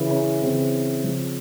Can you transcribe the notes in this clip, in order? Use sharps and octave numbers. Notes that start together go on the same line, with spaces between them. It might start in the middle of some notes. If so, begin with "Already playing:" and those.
Already playing: C#3 E3
C#4
C#3 E3 C4
C#3 F3